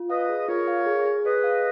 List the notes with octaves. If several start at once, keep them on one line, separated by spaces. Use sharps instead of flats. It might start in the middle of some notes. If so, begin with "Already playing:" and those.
Already playing: F4
B4 D#5 F5
G#4
F4 A#4 C#5
F5
G#4
G#4
G#4 B4 D#5
F5